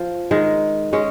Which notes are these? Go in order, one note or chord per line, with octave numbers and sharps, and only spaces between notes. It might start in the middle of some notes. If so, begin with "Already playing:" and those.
Already playing: F3
D#3 G#3
G#3 C#4